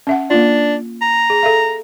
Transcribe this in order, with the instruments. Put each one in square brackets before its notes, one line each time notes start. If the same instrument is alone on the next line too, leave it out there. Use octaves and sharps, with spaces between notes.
[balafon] C#4 E5 F#5
[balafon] A#3 F4 [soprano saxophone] D4
[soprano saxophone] A#5
[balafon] G#4
A4 E5 F5